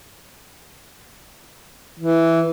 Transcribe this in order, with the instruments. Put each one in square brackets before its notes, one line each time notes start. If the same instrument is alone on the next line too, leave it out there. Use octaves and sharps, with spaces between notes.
[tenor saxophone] E3